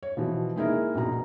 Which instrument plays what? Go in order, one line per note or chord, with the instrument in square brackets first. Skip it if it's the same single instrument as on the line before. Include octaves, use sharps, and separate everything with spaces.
[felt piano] C#5
B2 E3 F3
G#3 A#3 D#4 E4 G#4 A#4
A#1 B2 A#5